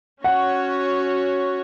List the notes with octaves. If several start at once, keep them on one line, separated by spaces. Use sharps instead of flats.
C#4 F#4 C#5 F#5